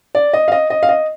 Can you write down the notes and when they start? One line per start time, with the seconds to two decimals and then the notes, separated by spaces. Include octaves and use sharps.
0.15 D5
0.33 D#5
0.48 F5
0.52 D#5
0.70 D#5
0.83 F5
0.89 D#5